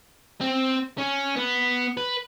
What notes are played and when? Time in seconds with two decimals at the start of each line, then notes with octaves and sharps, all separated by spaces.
0.41 C4
0.99 C#4
1.36 B3
1.97 B4